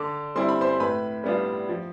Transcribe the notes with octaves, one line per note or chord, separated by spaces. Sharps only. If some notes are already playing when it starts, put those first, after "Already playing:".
Already playing: D3 D5 D6
G3 C4 E4 C6
B5
C5 C6
A2 B4 B5
G3 B3 D4 F4
F3